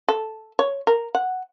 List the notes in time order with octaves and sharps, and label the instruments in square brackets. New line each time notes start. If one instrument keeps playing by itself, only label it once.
[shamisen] A4
C#5
A#4
F#5